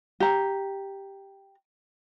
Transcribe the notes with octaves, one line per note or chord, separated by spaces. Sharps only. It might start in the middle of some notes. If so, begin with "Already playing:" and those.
G4 A#5